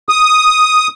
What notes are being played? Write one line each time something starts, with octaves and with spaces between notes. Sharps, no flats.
D#6